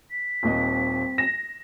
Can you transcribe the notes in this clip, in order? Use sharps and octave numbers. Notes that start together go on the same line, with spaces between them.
B6
D#1 D#2 C4 D#5
A#6 E7